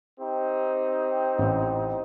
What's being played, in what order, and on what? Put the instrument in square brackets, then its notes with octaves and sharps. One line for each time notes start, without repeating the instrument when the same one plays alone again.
[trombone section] C4 D#4 G4
[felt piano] A1